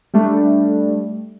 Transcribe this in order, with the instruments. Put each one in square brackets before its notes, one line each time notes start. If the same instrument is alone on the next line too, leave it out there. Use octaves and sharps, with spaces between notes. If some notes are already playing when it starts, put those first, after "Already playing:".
[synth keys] G3 A3 D4